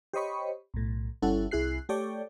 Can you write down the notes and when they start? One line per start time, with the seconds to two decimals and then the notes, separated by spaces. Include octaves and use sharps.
0.13 G4 C5 C#5 D#5 B5 C#6
0.74 B1 A2
1.22 G1 G3 C#4 E4 A4 F#5
1.51 C2 E4 G#4 F#6 C7
1.89 A3 G4 A4 C#5 D5 G5